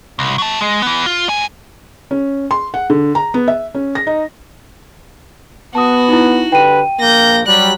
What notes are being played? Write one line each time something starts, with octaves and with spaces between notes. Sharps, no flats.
C2
F#3 A5
G#3
E3 B3
F4
G#2 G#5
C#4
C6
F#5
D3
A#5
B3
E5
C#4
A#6
D#4
B3 F#4 A5 D#6
D#4 E4
D3 G4 B4 G5 D#7
A#1 A#3 G6 A#6
F#3 G3 F#6 B6